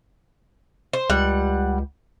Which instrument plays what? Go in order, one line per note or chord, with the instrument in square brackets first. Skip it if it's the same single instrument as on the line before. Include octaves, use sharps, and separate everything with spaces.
[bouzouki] C5
[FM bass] C#2 [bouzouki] G3 F#5